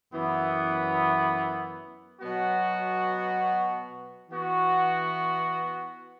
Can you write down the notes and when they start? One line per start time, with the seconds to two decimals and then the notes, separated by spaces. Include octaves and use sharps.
0.12 F#2 E3 B3
2.20 B2 F#3 B3 F#4
4.30 E3 B3 F#4